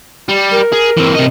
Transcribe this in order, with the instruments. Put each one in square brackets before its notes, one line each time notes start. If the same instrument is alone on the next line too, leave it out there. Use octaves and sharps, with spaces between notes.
[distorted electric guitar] G3
[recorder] A#4
[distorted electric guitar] G#4
E3 C4
C3 D#5